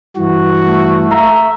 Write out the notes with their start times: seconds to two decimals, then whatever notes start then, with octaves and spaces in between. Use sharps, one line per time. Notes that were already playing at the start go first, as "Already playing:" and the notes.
0.17 G2 E3 F#4
0.61 A3
1.11 E5 F5 A#5 D#6